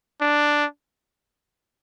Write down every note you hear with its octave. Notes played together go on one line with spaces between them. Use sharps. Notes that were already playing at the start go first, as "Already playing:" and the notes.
D4